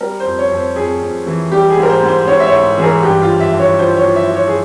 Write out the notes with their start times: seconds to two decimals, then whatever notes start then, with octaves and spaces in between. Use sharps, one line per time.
0.01 G3 A#4
0.20 C5
0.25 F2
0.39 C#5
0.52 F2
0.57 C5
0.76 F2 G#4
1.02 F2
1.26 E3
1.52 G3 G4
1.70 G#4
1.77 G#2
1.83 A#4
1.90 C5
2.03 G#2
2.09 C5
2.27 G#2 C#5
2.40 E5
2.47 C#5
2.52 G#2
2.78 E3 G#4
2.84 A#4
3.02 G2 G4
3.22 F4
3.28 F3
3.40 E5
3.53 G2
3.60 C#5
3.78 F3 C5
3.97 C#5
4.04 F3
4.16 E5
4.29 F3
4.35 C#5
4.47 G#4